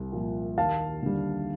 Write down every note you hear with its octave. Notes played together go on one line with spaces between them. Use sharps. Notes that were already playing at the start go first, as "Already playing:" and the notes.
Already playing: C2
A#2 F3
D#2 F5 A5
D3 G3